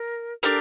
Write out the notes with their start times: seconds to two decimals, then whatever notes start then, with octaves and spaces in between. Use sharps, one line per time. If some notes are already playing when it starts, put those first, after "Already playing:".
Already playing: A#4
0.43 D4 G4 A4 A#4